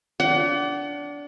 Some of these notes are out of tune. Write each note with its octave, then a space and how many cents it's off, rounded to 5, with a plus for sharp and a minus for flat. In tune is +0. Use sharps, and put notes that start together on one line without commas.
D4 -20 F#5 +30